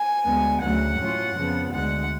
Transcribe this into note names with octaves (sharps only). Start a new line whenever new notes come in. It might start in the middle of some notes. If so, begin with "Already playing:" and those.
Already playing: G#5
D2 D3 G#3 B3
D2 C#3 F#3 A3 F#5
A2 F#3 C#4 F4
F2 C#3 F3 B3
D2 D3 G#3 F#5